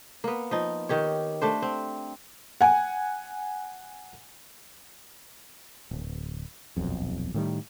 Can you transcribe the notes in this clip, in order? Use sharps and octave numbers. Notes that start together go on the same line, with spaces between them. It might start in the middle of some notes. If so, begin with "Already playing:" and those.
A#3 B3
F3 D#4
D#3 G4 C#5
A3 D4 C5
C4
F#5 G#5
D1
D#1 B1 F2
A2 D#3 G3